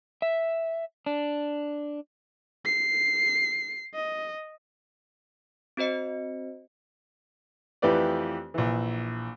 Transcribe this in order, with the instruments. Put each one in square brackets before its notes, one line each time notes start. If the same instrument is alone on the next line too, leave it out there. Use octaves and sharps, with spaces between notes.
[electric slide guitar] E5
D4
[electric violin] C7
D#5
[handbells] C4 F#4 C5 D#5 C#7
[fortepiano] F2 E3 A3 G4 B4 D5
A#1 E3